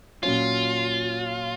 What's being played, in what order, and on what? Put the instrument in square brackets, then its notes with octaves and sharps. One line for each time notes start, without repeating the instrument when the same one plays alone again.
[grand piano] A#2 F#3 C#4 [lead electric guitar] F4